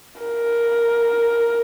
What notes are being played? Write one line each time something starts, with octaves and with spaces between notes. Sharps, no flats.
A#4